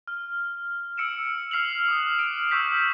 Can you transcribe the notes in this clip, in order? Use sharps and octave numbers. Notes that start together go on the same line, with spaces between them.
F6
E6 C#7 D7 E7
F6 C7 F7 F#7
D6 D#6 F#6
D7 F7
C#6 D6 E6 G6 B6